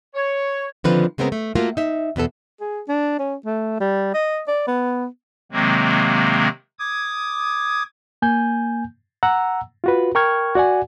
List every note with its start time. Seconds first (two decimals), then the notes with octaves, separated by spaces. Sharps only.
0.15 C#5
0.84 D3 D#3 F3 C4 F4 B4
1.18 C#3 G#3 B3 C4 A#4
1.32 A3
1.55 A3 A#3 F4 F#4 A#4
1.77 D#4 E5
2.16 E2 B2 B3 A4
2.61 G#4
2.88 D4
3.19 C#4
3.45 A3
3.80 G3
4.14 D#5
4.48 D5
4.67 B3
5.52 C3 D#3 F#3 G#3 A#3 C4
6.79 D6 D#6 G#6
8.22 A#3 G#5 G6
9.23 F#5 A#5 E6
9.84 F4 F#4 B4
10.15 A#4 G5 C#6 F6 G#6
10.55 F#4 D5 F#5 G#5